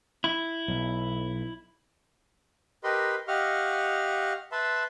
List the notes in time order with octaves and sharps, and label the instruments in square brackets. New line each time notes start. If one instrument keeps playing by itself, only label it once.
[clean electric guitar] E4
[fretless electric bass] B1
[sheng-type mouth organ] G4 A#4 B4 D#5 B5 C6
G4 D#5 F5 F#5 C#6 F6
B4 E5 A5 B5 C6